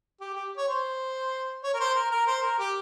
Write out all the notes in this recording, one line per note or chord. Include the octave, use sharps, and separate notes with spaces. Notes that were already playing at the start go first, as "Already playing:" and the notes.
G4
G4
C#5
C5
C#5
A#4
C5
A#4
A#4
C5
A#4
G4